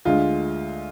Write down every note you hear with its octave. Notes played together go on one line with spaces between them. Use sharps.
D2 D3 G#3 F4